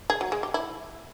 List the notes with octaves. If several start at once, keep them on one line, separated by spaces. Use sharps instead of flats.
G#4
F#3
G#3
G4
E4